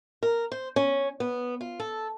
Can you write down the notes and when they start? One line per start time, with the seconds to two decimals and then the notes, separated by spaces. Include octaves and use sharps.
0.23 A#4
0.52 C5
0.76 C#4
1.20 B3
1.61 F4
1.80 A4